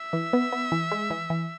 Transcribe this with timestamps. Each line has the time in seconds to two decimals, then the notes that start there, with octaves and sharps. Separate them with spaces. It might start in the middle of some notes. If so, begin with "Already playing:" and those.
Already playing: E5
0.13 E3
0.33 B3
0.53 B3
0.72 E3
0.92 G#3
1.10 E3
1.30 E3